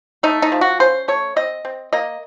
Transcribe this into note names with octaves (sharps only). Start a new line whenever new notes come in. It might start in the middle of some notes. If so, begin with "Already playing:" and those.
A3 D#4
D#4
F3
F#4
C#4 C5
A3 C#5
C4 D#5
C4
A#3 D#5